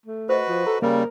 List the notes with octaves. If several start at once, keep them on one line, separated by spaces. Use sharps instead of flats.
A3
F#4 B4 C5 D#5
F3
A4 A#5
C#3 G3 A#3 A#4